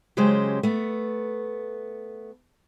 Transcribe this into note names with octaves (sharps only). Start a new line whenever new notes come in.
C#3 F#3 G#3 C#4 G4 C5
A3 B3